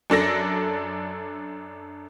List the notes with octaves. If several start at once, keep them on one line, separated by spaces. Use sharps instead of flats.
F#2 D4 A4 A#6